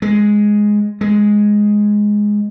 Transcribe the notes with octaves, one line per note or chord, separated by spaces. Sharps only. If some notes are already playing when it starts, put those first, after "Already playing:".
G#3
G#3